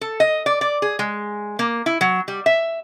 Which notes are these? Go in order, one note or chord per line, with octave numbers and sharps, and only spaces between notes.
A4
D#5
D5
D5
G#4
G#3
A#3
E4
F#3
G3
E5